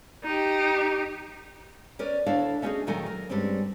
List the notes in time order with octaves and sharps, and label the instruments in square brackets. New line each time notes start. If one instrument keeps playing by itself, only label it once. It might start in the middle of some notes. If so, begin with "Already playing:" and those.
[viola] D#4 G4
[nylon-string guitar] C#4 A#4 B4 D5
D2 D4 E4 A4 C#5 F5
A3 C#4 D#4 F4 F#4 G#4
A#2 D#3 F#3 A3 A#4 G#5
A#4
G2 G3 G#3 C4 C#4